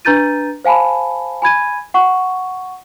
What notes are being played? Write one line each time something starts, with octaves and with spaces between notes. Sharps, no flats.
D4 B4 A#5 G6 A6 D#7
C5 F5 G#5 A5 B5
G#5 B5 G#6 D#7
F#5 C#6